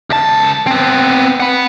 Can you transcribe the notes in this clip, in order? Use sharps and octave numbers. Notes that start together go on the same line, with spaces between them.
C#2 A5
B3 C4
F#5 B5